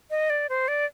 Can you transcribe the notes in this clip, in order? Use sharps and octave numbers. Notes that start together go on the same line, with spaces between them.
D#5
D5
C5
D5